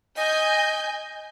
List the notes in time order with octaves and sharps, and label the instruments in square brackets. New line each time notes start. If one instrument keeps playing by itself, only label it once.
[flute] D#5 [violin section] G#5 G6